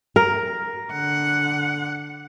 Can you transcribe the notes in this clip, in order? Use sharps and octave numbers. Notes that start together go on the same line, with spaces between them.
A#4
D3 F#5